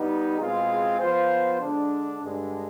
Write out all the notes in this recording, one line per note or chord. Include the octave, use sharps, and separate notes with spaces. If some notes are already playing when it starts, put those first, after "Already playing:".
Already playing: G3 B3 D#4
B2 G#3 C4 F4 G#4
F3 B3 F4 C5
D3 G#3 D4
G2 D3 G#3